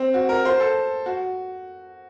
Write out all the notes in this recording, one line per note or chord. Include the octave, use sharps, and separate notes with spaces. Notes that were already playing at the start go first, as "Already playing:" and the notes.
Already playing: C4
F#4
A#4
C5
A4
F#4